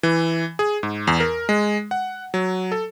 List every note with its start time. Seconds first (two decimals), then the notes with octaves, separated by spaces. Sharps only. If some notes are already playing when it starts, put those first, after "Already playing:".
0.03 E3
0.59 G#4
0.83 G#2
1.07 E2
1.20 A#4
1.49 G#3
1.91 F#5
2.34 F#3
2.72 A4